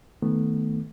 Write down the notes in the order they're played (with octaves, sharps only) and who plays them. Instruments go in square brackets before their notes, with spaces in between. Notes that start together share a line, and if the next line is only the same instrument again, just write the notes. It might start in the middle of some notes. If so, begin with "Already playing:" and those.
[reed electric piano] D#3 A3 B3